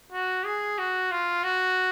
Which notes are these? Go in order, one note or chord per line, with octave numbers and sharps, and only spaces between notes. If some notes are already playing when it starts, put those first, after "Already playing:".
F#4
G#4
F#4
F4
F#4